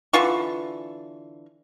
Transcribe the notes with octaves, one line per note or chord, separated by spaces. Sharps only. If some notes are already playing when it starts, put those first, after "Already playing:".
D3 E3 F4 C#6